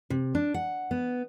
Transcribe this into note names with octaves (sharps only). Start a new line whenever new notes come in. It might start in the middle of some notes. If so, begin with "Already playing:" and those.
C3
D4
F#5
B3